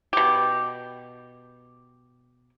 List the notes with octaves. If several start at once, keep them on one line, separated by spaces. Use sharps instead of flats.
B2 G4